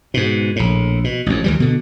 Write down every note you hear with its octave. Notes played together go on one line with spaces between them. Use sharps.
G#2 B2
A#1 A2
B2
A1 F2
D2 E3 G3
B2 D3